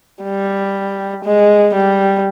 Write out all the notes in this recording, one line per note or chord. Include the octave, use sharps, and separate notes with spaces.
G3
G#3
G3